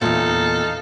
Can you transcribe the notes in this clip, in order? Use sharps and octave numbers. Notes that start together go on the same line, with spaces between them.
E2 G2 A#2 D#4 A4 F5